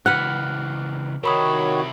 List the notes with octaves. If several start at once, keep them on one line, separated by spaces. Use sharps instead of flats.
C#2 E3 B4 F#5 F6 F#6
C3 D#3 E4 F#4 A#4 C#5 B5 D#6